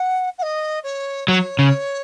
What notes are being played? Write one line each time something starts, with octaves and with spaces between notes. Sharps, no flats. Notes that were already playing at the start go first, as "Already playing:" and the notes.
Already playing: F#5
F#5
D#5
C#5
F#3 C#5
C#3